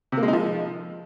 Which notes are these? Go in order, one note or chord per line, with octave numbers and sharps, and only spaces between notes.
C3
A#3
G#3
D#4
F3